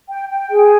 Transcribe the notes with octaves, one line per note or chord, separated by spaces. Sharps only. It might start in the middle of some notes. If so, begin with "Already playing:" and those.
G5
G5
G#4